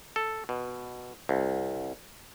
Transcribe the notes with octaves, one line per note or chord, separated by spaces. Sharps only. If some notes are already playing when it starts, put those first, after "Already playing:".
A4
B2
C2